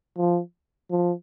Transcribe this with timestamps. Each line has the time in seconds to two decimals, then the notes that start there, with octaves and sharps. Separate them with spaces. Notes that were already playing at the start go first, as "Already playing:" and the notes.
0.18 F3
0.90 F3